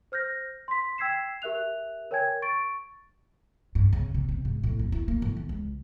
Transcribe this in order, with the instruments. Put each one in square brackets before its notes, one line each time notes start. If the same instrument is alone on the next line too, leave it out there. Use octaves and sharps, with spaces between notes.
[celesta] C5 F6 G6 A#6
C6 B6
G5 E6 G#6 B6 C7 E7
G4 A#4 E5 F#6 F7
A#4 C#5 G5 G#5 G#6
C#6 A6 D7
[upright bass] G2
C#3
C3
C3
G#2
A2
F2
E4
A#3
A2
D#3
C#2